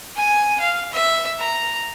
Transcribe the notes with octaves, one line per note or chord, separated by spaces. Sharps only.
G#5
F5
E5
A#5